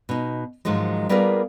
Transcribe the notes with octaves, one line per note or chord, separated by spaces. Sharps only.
B2 D#4
G#2 D#3 F3 F#3 G#3
G3 A#3 B3 F4 G#4 A#4